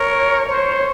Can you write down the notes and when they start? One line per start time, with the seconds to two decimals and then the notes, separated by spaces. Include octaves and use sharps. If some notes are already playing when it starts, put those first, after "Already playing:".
Already playing: A#4 C#5
0.49 C5 C#5